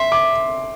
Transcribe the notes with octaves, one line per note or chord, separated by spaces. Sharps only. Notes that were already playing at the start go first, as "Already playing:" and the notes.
Already playing: E5 C6
D6